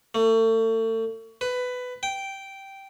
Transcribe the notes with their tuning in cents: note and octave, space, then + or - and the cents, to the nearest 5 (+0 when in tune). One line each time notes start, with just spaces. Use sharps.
A3 +35
B4 +15
G5 -5